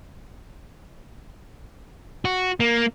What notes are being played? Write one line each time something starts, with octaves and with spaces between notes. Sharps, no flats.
F#4
A#3